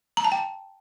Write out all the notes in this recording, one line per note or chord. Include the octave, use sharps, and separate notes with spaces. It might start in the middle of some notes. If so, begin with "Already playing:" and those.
A#5
A5
G5